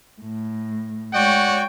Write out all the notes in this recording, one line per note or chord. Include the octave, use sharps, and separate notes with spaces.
A2
G#3 F#4 C#5 D5 F#5 G5